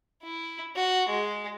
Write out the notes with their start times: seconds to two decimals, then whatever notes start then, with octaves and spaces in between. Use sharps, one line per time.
0.23 E4
0.76 F#4
1.09 G#3